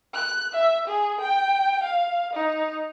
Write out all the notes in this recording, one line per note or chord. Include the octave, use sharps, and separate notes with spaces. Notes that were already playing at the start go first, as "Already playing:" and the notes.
F#6
E5
G#4
G5
F5
D#4